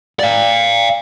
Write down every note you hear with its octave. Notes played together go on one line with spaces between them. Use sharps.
D5 F5